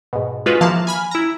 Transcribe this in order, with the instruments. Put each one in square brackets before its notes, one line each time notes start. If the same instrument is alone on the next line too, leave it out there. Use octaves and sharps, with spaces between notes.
[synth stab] G#2 B2
G#3 F4 F#4 G#4 B4
E3 F3 A#3 F5 A5
G#5 B5 F6
E4 A#5